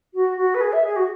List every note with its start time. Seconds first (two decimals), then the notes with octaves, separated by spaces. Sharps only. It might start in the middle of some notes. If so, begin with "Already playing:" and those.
0.14 F#4
0.37 F#4
0.55 B4
0.61 G#4
0.73 E5
0.84 G#4
0.96 F#4